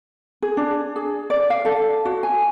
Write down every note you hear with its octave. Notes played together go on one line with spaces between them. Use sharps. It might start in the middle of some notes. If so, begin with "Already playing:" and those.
G#4
D4
G#4
D5
F5
A4
F#4
G#5